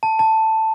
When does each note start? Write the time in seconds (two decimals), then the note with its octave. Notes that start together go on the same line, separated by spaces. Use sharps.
0.03 A5
0.19 A5